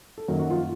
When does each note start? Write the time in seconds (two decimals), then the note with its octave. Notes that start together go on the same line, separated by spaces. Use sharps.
0.18 A4
0.28 F#2 D#3 F#3 A#3 A#4
0.39 F#3 F#4
0.50 F3 F4